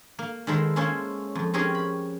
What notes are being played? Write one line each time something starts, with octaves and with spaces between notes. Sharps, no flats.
A#3
D#3 G#3 E4 A4 A#4 C5
G#3 A#3 C#4 A4 C5 C#5
F2
C4 C#4 G4 G#4 A#4 C#5
B5